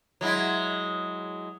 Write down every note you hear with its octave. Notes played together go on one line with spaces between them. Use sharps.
F#3 G#3 E4